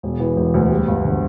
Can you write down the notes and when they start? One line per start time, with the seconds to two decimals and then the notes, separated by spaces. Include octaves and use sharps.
0.03 E1
0.20 E3
0.36 E1
0.54 D2
0.70 G3
0.87 G1
1.04 D3